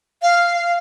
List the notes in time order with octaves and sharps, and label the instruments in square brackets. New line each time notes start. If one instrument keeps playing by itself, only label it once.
[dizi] F5